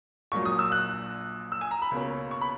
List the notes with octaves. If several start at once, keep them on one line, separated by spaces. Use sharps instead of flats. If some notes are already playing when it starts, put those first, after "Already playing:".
A#1 A#2 F#3 C#6
D#6
E6
F#6
E6
G#5
A#5
B5
C#2 B2 A#3 C#4
C#6
B5